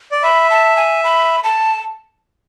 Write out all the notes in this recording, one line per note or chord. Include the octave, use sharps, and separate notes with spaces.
D5
E5 B5
A5
G#5
B5
A5